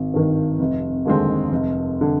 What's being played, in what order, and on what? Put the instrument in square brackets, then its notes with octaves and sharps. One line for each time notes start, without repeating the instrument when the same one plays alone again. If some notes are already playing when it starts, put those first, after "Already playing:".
Already playing: [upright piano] G#1
G2 D#3
F1
D#2 D3 G#3 C4
F1
D3